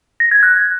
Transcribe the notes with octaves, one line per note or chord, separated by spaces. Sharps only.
A#6
G#6
F#6